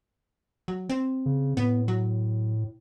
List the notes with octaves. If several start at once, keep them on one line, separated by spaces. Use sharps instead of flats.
F#3
C4
C#3
A2 B3
F#3